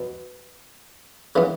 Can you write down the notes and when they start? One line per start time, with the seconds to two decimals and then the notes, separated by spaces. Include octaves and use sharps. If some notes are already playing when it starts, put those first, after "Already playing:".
Already playing: B2 B3
1.35 C#3 E3 B3